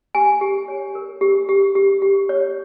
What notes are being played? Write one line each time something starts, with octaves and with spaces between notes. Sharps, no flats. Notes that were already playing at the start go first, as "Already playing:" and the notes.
G4 G#5
G4
C#5
A#4
G4
G4
G4
G4
C#5